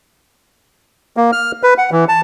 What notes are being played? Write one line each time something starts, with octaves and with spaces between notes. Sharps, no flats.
A#3
F6
B4
F#5
E3
A5